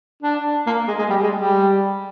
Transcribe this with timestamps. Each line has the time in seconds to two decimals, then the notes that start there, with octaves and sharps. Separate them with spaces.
0.23 D4
0.66 A#3
0.88 G#3
0.99 G#3
1.10 G3
1.24 G#3
1.38 G3